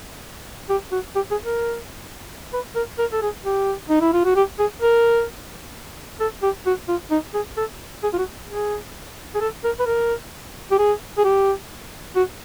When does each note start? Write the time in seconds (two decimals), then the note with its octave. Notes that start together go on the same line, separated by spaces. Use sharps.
0.69 G4
0.92 F#4
1.15 G4
1.31 G#4
1.46 A#4
2.53 B4
2.75 A#4
2.98 A#4
3.13 A4
3.22 G#4
3.45 G4
3.89 D#4
4.01 E4
4.13 F4
4.25 F#4
4.36 G4
4.59 G#4
4.82 A#4
6.20 A4
6.42 G4
6.66 F#4
6.88 F4
7.11 D#4
7.34 G#4
7.57 A4
8.03 G#4
8.13 F4
8.18 F#4
8.49 G#4
9.35 G#4
9.41 A4
9.64 A#4
9.79 B4
9.86 A#4
10.71 G4
10.78 G#4
11.18 G#4
11.24 G4
12.16 F#4